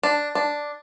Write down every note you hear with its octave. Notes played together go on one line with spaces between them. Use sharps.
D4
D4